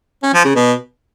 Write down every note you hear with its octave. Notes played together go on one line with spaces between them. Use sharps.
C#4
F3
C#3
B2